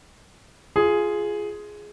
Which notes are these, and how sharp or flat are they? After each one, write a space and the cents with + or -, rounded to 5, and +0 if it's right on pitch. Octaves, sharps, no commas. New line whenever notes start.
F4 -5 G#4 +5